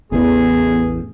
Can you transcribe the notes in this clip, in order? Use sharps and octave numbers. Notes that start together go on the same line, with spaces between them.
A1 E2 B3 G#4